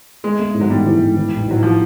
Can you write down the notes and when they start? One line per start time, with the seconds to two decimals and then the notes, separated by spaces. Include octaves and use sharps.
0.24 G#3 A3
0.39 A3
0.54 G#2
0.61 F#3
0.70 G#2 G3
0.85 E3
1.01 G#2
1.16 E3
1.32 A1
1.48 A1 F#3
1.63 A2 F3